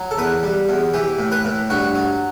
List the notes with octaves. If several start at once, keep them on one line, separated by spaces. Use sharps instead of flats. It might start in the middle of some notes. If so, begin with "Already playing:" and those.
Already playing: F#3
A4
E2 B4
G3
E2
E3 G4
A2
B4
A2
G2 F#4
F#3